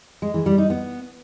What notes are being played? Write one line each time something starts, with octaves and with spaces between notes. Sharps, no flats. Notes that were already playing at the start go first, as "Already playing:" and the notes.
G#3
E3
G3
D#4
B3